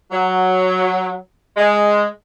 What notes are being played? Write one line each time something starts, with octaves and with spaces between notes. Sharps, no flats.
F#3
G#3